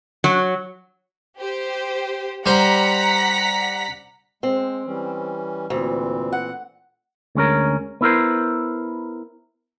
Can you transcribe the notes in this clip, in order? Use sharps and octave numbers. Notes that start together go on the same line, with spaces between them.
F#3
G4 C5
G3 C5 F#5 A#5 B6
G#3 C4
E3 G3 C#4
D2 A#2 E3 C4
F#5
D2 G#3 C#4 A#4
B3 E4 A#4 C5